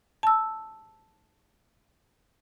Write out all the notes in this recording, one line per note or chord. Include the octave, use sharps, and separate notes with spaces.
A5 E6